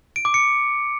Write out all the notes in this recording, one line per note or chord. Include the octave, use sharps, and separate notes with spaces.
D7
D6
C#7